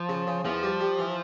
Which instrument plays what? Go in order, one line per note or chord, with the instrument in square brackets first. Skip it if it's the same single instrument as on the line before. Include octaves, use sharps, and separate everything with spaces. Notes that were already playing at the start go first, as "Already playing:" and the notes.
Already playing: [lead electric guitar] F3
[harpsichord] C#3
C#3
[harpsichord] E2 [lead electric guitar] F3
[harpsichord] G3
G3
E3